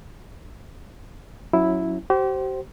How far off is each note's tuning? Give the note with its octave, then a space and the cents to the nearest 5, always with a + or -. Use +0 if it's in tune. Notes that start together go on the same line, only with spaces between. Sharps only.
F#3 -10 C#4 +0 E4 +0
G4 -40 C5 +5